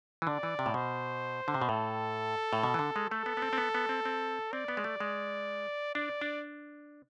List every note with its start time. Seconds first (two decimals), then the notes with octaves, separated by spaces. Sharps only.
0.22 E3
0.27 D3 D5
0.43 E3
0.59 C3
0.66 A2
0.74 B2 C5
1.48 D3
1.54 C3
1.62 B2
1.69 A2 A4
2.53 A2
2.63 B2
2.74 E3
2.79 D3
2.96 G#3
3.10 A3 A4
3.26 B3
3.37 B3
3.42 C4
3.53 C4
3.58 B3
3.75 B3
3.89 C4
4.05 C4
4.52 C4 D5
4.68 B3
4.77 G#3
4.84 A3
5.00 G#3
5.95 D4 D5
6.21 D4